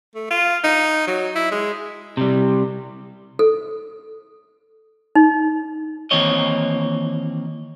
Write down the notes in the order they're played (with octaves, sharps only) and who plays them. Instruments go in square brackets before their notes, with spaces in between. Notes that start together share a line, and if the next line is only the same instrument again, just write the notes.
[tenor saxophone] A3
F4
D#4
F#3
E4
G#3
[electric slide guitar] C3 G3
[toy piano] A4
D#4
[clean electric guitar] D#3 E3 A#3 C4 C#5 D#5